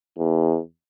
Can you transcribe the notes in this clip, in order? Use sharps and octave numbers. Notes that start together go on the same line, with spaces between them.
E2